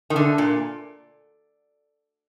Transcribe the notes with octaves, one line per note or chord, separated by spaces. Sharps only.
D#3
D3
A#2